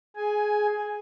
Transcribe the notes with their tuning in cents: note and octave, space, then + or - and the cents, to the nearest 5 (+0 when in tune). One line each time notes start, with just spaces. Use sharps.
G#4 +15 G#5 +0